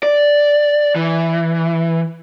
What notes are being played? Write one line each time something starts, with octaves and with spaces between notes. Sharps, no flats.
D5
E3